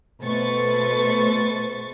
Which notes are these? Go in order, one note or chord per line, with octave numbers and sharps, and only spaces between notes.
B2 A3 B4 C5 C#6 A6